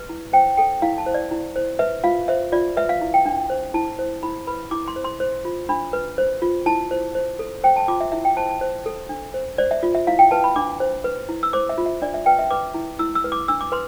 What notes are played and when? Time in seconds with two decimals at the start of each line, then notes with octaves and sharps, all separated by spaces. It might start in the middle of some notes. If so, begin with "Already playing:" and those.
Already playing: B4
0.09 E4
0.33 C5 G5
0.57 A4 G5
0.82 E4 F5
0.98 A5
1.06 C5
1.14 D5
1.31 E4
1.56 C5
1.79 B4 E5
2.04 F4 F5
2.28 C5 E5
2.52 F4 D5
2.77 B4 E5
2.89 F5
3.01 E4
3.14 G5
3.25 D4
3.50 C5
3.74 E4 A5
3.99 C5
4.23 E4 B5
4.47 B4 B5
4.71 E4 D6
4.88 C6
4.96 C5
5.04 C6
5.20 C5
5.45 F4
5.69 D4 B5
5.93 B4
6.18 C5
6.42 F4
6.66 E4 A5
6.91 C5
7.15 C5
7.39 A4
7.64 C5 G5
7.76 A5
7.88 F4 D6
8.01 E5
8.12 E4 E5
8.25 G5
8.37 C5 A5
8.49 A5
8.61 C5
8.86 A4
9.09 D4
9.34 C5
9.58 C5 D5
9.71 E5
9.83 F4
9.95 E5
10.07 E4 F5
10.19 G5
10.31 B4 A5
10.44 B5
10.56 D4 D6
10.80 C5
11.04 B4
11.29 E4
11.43 E6
11.53 C5 D6
11.69 E5
11.78 F4
11.86 E5
12.02 D4 D5
12.14 E5
12.26 B4 G5
12.39 E5
12.51 B4 D6
12.74 E4
12.99 E4 E6
13.15 E6
13.24 B4
13.32 D6
13.48 D4 E6
13.61 D6
13.72 B4 C6